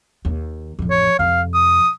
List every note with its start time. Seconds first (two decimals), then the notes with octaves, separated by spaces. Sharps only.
0.25 D#2
0.79 A1 F2
0.90 C#5
1.19 F2 C3 F5
1.54 D#6